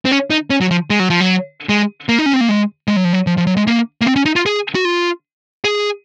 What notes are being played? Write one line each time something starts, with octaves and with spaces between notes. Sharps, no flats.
C4
C#4
D#4
C#4
F#3
F3
G#3
F#3
F3
F#3
G#3
A#3
D#4
C#4
C4
A#3
G#3
G#3
F#3
F3
F#3
F3
F3
F#3
G#3
A#3
A#3
C4
C#4
D#4
F4
G#4
F#4
F4
G#4